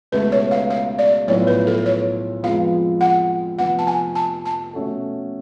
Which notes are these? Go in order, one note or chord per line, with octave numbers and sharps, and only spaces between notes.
C#2 B2 A3 B4
C#5
F5
F5
D5
B1 A2 F3 B3 F4 C#5
B4
A4
C#5
F2 F3 G#3 B3 F4 F5
F#5
F1 F2 F3 B3 F#5
A5
G#5
A5
A5
B2 A3 C#4 F#4 A4